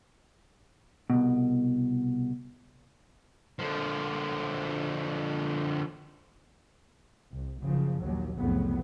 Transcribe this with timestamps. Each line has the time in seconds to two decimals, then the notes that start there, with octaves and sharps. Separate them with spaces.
1.10 C2 B2
3.59 D3 F3
7.32 C2
7.63 F#1 C#3 F3
8.00 A#1 D#2 F#3
8.38 C2 F2 A2 C#3 F#3 B3